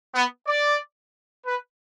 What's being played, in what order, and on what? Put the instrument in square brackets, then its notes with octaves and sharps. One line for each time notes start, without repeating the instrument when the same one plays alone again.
[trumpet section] B3
D5
B4